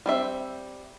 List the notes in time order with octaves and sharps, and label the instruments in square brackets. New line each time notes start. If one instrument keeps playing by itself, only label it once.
[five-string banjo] G3 C4 E5